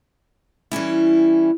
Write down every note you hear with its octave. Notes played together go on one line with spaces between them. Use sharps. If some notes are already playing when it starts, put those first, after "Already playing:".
E3 G3 C#4 E4